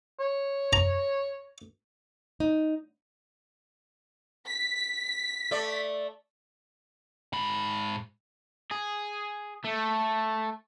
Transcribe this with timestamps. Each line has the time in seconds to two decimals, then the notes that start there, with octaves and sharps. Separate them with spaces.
0.20 C#5
0.73 A#5
2.40 D#4
4.47 B6
5.51 A3 D5
7.33 G#2 B5
8.71 G#4
9.65 A3